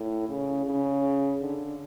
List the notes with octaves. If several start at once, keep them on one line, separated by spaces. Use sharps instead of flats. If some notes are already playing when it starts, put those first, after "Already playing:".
Already playing: A2
C#3
C#3
D3